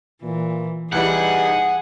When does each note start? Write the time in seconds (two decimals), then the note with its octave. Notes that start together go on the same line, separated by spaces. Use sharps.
0.23 A#2 E3
0.92 C2 E3 G3 D#4 G#4 F#5